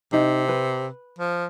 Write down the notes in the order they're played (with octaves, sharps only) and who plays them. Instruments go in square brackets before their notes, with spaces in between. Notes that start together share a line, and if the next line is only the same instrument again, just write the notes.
[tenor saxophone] C3 [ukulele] D#4
[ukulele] B4
[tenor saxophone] F3